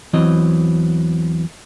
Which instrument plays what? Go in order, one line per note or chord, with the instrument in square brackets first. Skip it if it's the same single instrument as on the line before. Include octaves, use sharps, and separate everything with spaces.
[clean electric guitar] E2 E3 F#3 C4 D#5